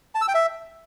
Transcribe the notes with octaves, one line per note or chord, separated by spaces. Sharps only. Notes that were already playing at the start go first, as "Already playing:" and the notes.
A5
E6
G5
E5